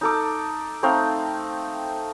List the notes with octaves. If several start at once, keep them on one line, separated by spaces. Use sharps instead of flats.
D#4 A4 D6
A3 C4 D#4 F5